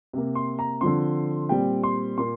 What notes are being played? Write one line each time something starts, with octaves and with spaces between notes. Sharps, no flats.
C3 A#3
C6
A#5
D3 F3 C4 C6
A#2 G3 C4 G5
C6
A#2 A#3 C6